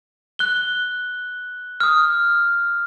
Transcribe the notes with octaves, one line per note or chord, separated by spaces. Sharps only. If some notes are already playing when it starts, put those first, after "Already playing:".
F#6 G7
D#6 F6